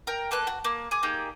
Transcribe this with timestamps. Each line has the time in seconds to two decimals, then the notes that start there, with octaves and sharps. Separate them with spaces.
0.07 A#4 G5
0.31 A#3 A4 B4 F#6
0.47 F#4
0.64 A#3
0.91 G#4 G#5 D6
1.03 A#3 D#4 G4 G#4